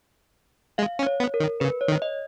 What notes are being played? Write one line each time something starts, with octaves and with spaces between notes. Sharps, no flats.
G#3 F5
C#4
C#5
B3
A#4
D#3
C#3 B4
C#5
D#3
D#5